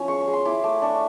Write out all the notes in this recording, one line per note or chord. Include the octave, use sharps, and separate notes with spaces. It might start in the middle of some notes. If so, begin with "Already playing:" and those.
Already playing: F3 C#4 E4
G#3 C#6
C#6
G#3
C6
E4 D6
A3 D6
D4 C#6